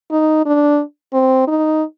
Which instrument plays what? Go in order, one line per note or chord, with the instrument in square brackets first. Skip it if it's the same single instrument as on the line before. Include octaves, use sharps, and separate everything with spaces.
[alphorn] D#4
D4
C4
D#4